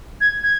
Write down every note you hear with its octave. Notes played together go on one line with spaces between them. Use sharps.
G#6
G#6